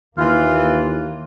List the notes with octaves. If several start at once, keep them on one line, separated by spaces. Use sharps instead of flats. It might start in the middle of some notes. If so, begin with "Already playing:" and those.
D#2 E3 A#3 F4